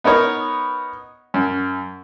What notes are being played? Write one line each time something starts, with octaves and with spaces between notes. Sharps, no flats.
B3 D#4 A#4 C#5
F#2